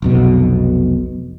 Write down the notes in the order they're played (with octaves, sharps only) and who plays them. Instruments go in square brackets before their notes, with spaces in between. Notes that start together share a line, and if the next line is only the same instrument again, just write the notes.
[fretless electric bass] F1 B1 B2